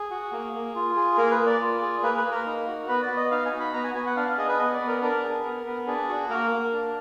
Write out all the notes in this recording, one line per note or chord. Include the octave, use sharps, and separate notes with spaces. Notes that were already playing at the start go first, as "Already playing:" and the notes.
Already playing: G#4
F#4
A#3
A#3
F4
G#4
A#3 A#4
B4
A#3
D5
F4
G#4
A#3 B4
B4
A#3
A#4
D#4
F#4
B3 B4
D5
B3
D#5
D#4 F5
G#5
F#4
B5
B3 A#5
G#5
B3 G#5
F#5
D4 F5
F5
G#4 D#5
B4
B3 D#5
D5
B3
A#4
D4 A#4
G#4
B3
B3
D4 G#4
F#4
A#3 A#4
A#3
D4